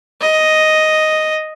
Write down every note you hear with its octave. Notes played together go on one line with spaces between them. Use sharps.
D#5